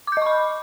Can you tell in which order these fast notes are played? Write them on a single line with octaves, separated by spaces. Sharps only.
D6 G6 D#5 C#6 B5